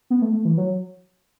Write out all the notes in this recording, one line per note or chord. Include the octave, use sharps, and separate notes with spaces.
B3
A3
A3
E3
F#3